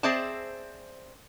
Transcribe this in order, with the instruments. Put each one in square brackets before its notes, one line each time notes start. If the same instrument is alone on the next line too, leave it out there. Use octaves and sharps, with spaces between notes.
[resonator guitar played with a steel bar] C4 G#4 C5 D5 E5 A5